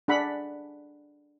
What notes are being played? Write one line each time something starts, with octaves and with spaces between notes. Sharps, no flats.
D4 G#4 F#5 B5